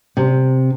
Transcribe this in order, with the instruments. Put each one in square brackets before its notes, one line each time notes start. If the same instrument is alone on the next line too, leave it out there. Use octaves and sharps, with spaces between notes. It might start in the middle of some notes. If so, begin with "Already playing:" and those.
[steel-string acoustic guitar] C3